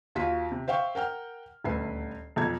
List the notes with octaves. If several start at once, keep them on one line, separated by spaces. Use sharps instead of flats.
D#2 F4 F#4 C6 B6
C3
C5 E5 F5 G5 C#6
A#4 F#5 G5 F6
D#1 D2 B4 E5 C7
B1 F2 G#6